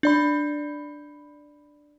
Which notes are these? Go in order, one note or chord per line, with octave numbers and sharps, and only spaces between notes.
D4 D5 B5